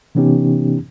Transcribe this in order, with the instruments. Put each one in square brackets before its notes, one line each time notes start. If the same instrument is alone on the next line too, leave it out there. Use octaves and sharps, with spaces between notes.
[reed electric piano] C3 E3 B3 C#4 D#4 G4